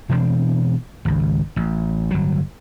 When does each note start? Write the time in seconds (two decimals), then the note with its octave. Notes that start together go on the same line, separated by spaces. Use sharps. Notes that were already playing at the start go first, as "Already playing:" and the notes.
0.09 B2 E3 C4 D4
1.05 G#1 C#2
1.56 A1
2.11 G1 F#3